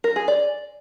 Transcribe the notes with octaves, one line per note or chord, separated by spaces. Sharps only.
A#4
G#4
D5